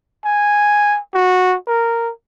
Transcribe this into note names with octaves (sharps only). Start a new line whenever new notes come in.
G#5
F#4
A#4